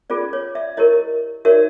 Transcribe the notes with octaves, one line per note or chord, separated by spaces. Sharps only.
C#4 F4 G#4 D5
C#5
D5 E5
E4 G4 A#4 C#5 D#5
D#4 F#4 A#4 C#5 D5 E5